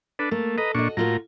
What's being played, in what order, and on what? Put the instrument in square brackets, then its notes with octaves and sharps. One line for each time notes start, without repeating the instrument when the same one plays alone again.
[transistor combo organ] D4 A4 B4
[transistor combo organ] A3 [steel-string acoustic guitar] A#3
[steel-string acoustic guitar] A4 [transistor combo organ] B4 D#5 A#5
[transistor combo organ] A#2 D4 C#6 [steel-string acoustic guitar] F#4 D#5
[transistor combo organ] A2 A#5 [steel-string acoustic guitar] A#3 F4 F#4